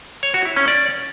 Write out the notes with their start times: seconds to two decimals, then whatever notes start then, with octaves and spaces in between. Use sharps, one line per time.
0.23 C#5
0.34 F#4
0.45 E4
0.56 C#4
0.68 D5